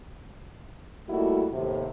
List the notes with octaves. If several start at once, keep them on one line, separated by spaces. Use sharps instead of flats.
G3 A3 A#3 D#4 E4 F#4
D#2 A2 C3